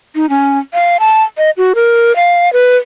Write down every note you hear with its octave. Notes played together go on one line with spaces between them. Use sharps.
D#4
C#4
F5
A5
D#5
F#4
A#4
F5
B4